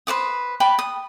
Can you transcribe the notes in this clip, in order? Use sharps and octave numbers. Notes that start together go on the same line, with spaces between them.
B4 C5 D6 D#6
B4 D5 G5 B5
D#6